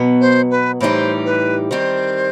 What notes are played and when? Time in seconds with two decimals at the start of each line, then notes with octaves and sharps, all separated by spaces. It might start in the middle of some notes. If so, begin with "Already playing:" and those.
Already playing: B2 F#3 B3
0.21 C5
0.51 B4
0.80 A2 E3 G3 D#4 G4 C5
1.25 B4
1.70 D#3 G3 C4 C5